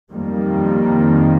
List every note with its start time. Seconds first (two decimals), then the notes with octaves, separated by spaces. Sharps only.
0.13 F2 D#3 G3 A#3